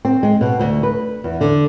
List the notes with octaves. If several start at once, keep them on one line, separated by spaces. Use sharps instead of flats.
C4
G#3
B2
D2
B4
E2
D3